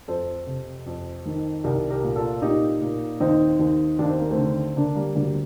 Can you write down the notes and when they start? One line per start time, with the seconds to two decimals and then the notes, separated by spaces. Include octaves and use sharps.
0.08 F2 A4 C5
0.47 C3
0.86 F2
1.25 D#3
1.64 C2 G4 A#4
1.90 G4 A#4
2.03 A#2
2.16 F4 A4
2.42 A#2 D#4 G4
2.81 A#2
3.20 D#2 C4 D#4
3.59 D#2
3.99 D#2 D4
4.09 C4
4.19 A#3
4.30 A3 C4
4.38 D3
4.76 D3 A#3 D4
4.96 G3 A#3
5.15 D2 G3 A#3